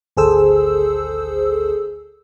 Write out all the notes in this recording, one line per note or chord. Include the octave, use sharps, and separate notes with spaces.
G#1 D2 G#4 A4 C5 E6